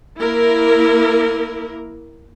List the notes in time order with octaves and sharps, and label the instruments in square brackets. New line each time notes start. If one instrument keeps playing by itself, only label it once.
[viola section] A#3 E4 A#4